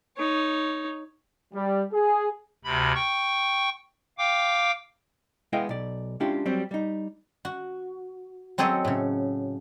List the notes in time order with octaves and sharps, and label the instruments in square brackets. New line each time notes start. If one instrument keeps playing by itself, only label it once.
[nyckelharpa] D#4 C#5
[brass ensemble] G3
G#4
[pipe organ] D2 C3 B5
G5 C#6
F5 G5 D6
[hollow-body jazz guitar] G#3 B3 E4 D#5 F5 G5
B1 D5
G#3 C#4 D4 E4 F4 G4
F#3 G3 C4
G3 D#4
[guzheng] F#4
F#3 C4 G#4 A4 C#5 D#5
A2 C#3